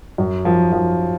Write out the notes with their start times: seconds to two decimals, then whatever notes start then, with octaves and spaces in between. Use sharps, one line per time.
0.18 F#2
0.45 F3
0.72 F3